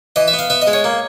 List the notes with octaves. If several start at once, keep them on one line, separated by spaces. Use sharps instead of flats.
E3 D#5
E5
B3
F5
B3 E5
D#5
G#3
C#5
A#3